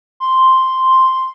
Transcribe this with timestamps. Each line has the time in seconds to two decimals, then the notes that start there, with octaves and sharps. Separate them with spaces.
0.20 C6